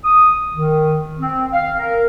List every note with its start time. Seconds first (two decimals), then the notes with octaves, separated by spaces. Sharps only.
0.05 D#6
0.55 D#3
1.19 C4
1.53 F5
1.78 A#4